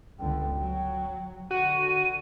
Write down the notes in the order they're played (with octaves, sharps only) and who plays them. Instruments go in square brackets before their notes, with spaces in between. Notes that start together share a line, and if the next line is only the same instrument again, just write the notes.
[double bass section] G1 C#2 D3 [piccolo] G5
[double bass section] F#3
[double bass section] D3 [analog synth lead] F#4 [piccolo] D#7